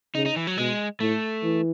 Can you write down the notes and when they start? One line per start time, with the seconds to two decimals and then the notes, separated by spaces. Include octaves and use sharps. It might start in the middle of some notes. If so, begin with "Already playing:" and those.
0.15 C#3 D#4
0.26 D#4
0.36 E3
0.47 F#3
0.58 B2 G#3
1.00 A2 A3
1.43 E3